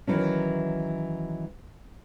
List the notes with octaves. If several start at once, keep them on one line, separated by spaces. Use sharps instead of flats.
D#3 E3 F#3 C#4